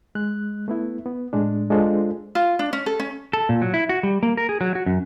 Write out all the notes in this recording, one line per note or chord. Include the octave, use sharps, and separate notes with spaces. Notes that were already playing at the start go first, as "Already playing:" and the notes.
G#3 F#6
A3 B3 E4
B3
A2 G#3 D4
G#3 D4 F4 A4 C5
F4
D4
C#4
A4
C#4
A4
A#2
F#3
E4
F#4
G3
A#3
A#4
G#4
F#3
F#4
F#2